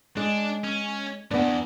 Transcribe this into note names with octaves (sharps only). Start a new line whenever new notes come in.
G#3 D4
C#4
E2 G2 B3 D4